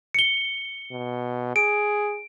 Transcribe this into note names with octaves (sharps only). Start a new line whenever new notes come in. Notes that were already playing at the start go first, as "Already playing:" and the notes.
C#7 G7
B2
G#4 D7